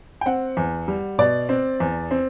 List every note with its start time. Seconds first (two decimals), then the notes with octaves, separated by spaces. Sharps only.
0.21 G5
0.26 C4 F#5
0.57 E2
0.88 G3
1.19 B2 D5
1.49 C4
1.80 E2
2.11 C4